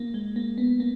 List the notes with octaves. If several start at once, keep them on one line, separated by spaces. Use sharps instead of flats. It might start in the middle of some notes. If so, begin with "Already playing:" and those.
Already playing: A#3
G#3
A#3
B3
A#3